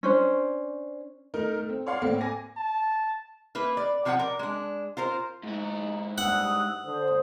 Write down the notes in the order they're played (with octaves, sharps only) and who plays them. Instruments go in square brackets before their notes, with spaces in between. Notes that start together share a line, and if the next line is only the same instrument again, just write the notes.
[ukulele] C#4 D4 C5
[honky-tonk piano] A3 D#4 A#4
A3
C4
C#5 D5 F5 F#5 C6
A2 A#3 C4
G#5 D6 A#6
[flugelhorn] A5
[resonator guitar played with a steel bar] A#3 E4 B4
D5
C3 F3 D4 F4 F#5 G#5
A#4 D5
G#3 D4
F4 A#4 C5
[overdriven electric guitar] G#2 E4 [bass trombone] D#4
[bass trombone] G2 [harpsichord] F#5 [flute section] D#6 E6 F#6
[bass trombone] D3 [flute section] C5 D#6